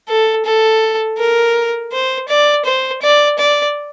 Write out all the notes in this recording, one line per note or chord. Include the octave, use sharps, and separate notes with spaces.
A4
A4
A#4
C5
D5
C5
D5
D5